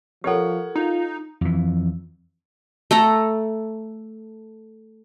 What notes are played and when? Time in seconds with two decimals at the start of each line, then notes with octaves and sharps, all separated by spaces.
0.24 F3 G4 A4 A#4 C#5 F#5
0.75 D#4 F4
1.41 F2 E3
2.91 A3 A4 A#5